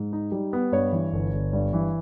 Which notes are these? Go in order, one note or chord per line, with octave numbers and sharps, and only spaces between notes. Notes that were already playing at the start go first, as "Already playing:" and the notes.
Already playing: G#2
D#4
G3
B3
G2 C#5
E3
G1
G1
G2
E3